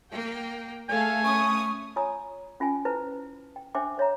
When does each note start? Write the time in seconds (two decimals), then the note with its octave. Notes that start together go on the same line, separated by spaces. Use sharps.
0.11 A#3 G5
0.89 A3 G#4 A4 F5 G#5
1.25 C#4 C#6 D#6
1.96 F4 C#5 G#5 A#5 D#6
2.60 C#4 F4 G5 G#5
2.85 E4 F4 B4 C5 A5
3.56 G5
3.75 D4 C5 E5 G5 G#5 D6
3.98 C5 C#5 E5 A#5